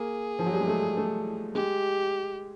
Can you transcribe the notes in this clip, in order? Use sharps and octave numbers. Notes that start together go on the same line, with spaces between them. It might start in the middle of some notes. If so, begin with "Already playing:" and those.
Already playing: A#3 G#4
F3
F#3
G3
G#3
A3
A3
G#3 G4